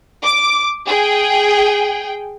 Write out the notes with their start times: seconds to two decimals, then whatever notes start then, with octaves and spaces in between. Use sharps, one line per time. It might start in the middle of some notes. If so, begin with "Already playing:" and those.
0.23 D6
0.87 G#4 G5